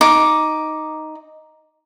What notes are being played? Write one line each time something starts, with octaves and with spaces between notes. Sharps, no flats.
D#4 D6